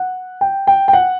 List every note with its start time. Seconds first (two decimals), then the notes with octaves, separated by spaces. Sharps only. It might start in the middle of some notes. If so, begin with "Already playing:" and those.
Already playing: F#5
0.41 G5
0.67 G5
0.88 G5
0.93 F#5